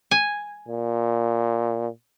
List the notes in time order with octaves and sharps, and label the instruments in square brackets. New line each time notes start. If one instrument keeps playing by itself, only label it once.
[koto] G#5
[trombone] A#2